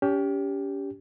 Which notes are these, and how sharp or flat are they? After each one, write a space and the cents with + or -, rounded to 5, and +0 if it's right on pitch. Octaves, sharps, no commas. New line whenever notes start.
C#4 +35 G4 +0